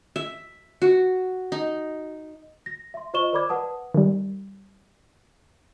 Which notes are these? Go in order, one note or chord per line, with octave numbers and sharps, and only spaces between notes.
E5
F#4
D#4
A#6
E5 C6
F4 C5 D#5 C#6 E7 G7
A#4 C5 D5 B5 D6 G#6
B4 F#5 A5 D#6
D#3 G3